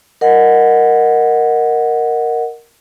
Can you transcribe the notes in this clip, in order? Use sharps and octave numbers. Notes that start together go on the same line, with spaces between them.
A#4 D#5 F#5